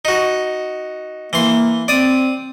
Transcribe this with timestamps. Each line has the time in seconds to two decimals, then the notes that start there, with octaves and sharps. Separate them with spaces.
0.05 D#4 F#4
1.33 E3 A#3 C6
1.88 C4 D5 D#6